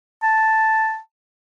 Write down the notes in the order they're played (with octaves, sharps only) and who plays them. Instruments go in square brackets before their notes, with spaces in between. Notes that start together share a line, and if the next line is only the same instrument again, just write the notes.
[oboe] A5